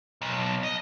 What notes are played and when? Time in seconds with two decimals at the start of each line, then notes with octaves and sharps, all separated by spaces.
0.22 B1
0.63 D#5